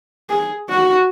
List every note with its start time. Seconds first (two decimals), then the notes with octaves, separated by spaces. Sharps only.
0.29 G#4
0.69 F#4